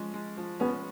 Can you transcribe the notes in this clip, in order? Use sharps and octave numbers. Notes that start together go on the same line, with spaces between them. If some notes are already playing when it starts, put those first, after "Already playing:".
Already playing: F3 G#3 C#4
G#3
F3
B3 C#4